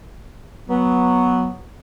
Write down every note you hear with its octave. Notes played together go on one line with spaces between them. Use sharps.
F#3 B3